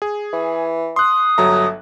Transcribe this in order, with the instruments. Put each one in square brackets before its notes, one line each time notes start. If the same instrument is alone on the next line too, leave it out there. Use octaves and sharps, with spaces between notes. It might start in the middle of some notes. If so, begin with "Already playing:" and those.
[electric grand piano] G#4
[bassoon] E3
[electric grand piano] C6 F#6 [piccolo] D#6
[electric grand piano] G1 F#3 A#5 [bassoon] A3